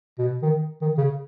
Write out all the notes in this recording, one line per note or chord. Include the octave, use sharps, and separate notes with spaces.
B2
D#3
D#3
C#3